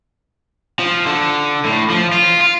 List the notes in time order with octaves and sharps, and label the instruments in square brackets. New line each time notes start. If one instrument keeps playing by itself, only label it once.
[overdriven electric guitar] F3
D3
A2
F3
F4
F4